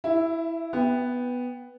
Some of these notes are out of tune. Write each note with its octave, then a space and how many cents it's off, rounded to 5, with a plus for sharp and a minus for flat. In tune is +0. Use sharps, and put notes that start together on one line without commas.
E4 +0 E5 +30
B3 +0 G5 +15